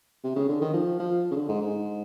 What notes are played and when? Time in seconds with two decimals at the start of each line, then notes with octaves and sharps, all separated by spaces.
0.24 C3
0.36 C#3
0.49 D3
0.61 D#3
0.73 F3
0.99 F3
1.31 C#3
1.36 D3
1.49 G#2
1.61 G#2